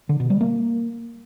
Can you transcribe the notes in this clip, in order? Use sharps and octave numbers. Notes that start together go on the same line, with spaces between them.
D3
B2
G3
A#3